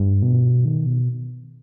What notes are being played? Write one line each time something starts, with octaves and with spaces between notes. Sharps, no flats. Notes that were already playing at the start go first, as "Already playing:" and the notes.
Already playing: G2
B2
D#3
B2